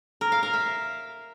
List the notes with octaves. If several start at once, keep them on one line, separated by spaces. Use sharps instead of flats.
A#4
F5
A#4
E5